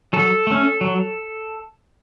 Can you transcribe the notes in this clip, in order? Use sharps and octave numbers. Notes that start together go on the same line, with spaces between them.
F#3 A4
A3 C#4
F#3